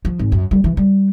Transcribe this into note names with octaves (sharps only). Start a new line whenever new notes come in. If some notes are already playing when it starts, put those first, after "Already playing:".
F3
G#1
F#2
G3
E3
G3